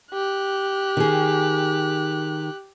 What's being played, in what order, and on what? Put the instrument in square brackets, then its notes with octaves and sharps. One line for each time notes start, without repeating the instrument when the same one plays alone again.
[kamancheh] G4 F#6
[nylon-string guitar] D#3 G#4